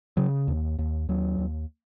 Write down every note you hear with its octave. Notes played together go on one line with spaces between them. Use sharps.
C#3 F#3
D#2
D#2
D#2 F#3
D#2